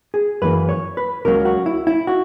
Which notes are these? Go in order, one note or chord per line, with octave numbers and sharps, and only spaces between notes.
G#4
F#2 E3 A#3 B4
C#5
B4
C#2 C#3 F#3 A#3 A#4
F#4
E4
E4
F#4